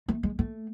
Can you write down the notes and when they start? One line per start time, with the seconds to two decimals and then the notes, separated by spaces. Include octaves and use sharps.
0.08 A3
0.23 G#3
0.39 A3